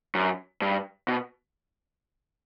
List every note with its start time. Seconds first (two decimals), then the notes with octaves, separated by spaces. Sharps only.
0.15 F#2
0.62 G2
1.08 B2